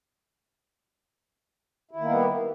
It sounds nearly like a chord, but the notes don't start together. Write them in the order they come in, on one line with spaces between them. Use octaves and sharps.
E4 D#3 A#3 B3 G3